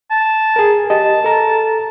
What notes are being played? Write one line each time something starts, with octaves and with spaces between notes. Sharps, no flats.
A5
G#4 A#4
G4 D#5 A5
A4 A#5